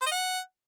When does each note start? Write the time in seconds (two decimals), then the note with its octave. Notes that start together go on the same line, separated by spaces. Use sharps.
0.01 C5
0.06 D#5
0.11 F#5